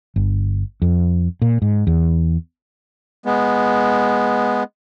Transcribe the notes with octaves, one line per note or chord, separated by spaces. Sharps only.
G1
F2
A#2
G#2
E2
G#3 B3